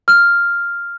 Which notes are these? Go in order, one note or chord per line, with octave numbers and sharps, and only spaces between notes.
F6